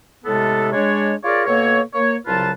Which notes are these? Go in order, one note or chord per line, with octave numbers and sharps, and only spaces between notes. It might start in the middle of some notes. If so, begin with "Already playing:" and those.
A2 C3 G#3 B3 A4
G#3 D4 C#5
F4 G#4 A#4 C#5 D5
B2 A#3 A4 C#5
A#3 C#5
C2 C#3 F#3 F4 B4 A5